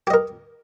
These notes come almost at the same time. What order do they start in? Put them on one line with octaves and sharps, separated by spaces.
G4 D#5 A#4